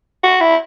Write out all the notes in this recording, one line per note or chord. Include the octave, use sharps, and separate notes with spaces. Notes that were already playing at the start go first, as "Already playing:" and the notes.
F#4
E4